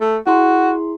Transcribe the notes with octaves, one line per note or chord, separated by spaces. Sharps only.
A3
E4 F#4 G#4 C6